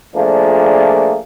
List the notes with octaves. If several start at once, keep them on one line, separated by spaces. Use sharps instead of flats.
A#2 F3 A3 A#3 D4 G#4